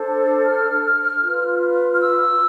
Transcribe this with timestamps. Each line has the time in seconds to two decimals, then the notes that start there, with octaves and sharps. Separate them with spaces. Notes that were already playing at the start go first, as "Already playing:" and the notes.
Already playing: D4 A4 C5
0.44 F6
1.22 F4 B4
1.94 F6
2.01 E6